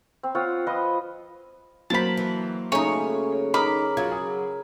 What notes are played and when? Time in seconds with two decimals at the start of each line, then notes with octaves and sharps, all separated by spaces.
0.23 C4
0.35 C4 F4 C#5 F#5
0.67 F3 B4 D#5
1.90 F#3 A#3 C5 A5 B5
2.17 E3
2.72 C#3 A3 D#4 C#5 G#5
3.54 D#4 A#4 B5 D6
3.97 F#3 F4 C#5 G#6
4.12 G#4